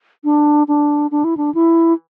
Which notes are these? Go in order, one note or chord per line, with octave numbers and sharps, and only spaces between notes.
D4
D4
D4
E4
D4
E4